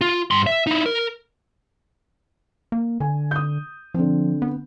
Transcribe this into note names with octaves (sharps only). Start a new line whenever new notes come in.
F4
G2 C6
E5
D#4 E4
A#4
A#3
D3 G#5
D#6 G6
D3 F3 C4
B3